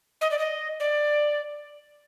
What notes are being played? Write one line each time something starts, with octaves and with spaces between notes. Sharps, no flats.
D#5
D5
D#5
D5